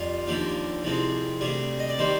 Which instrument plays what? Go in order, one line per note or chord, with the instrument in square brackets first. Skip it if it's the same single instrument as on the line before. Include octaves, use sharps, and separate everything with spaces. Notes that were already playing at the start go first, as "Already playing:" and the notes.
Already playing: [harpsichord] F2 G3 F4
D#2 D3 F3 A#3 G4
C2 C3 F3 G#3 C4
D2 C3 G3 G#4
D#5
D5
D#3 G3 A#3 C5